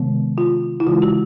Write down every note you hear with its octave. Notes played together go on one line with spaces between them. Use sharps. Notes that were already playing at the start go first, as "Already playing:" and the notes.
Already playing: C3 D#3 G#3 B3
F4
E4
C#3 E3 G#3 F4
F#4